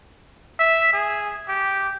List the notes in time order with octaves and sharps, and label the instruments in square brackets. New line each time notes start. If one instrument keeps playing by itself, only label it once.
[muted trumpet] E5
G#4
G4